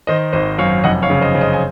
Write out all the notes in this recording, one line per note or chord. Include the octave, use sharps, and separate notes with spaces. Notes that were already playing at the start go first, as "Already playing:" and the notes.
D#3 C5 D#5
G#1 C5 D#5
F#2 C#5 F5
F1 D#5 F#5
C#5 F5
C#3
C5 D#5
C#3
C5 D#5
G#5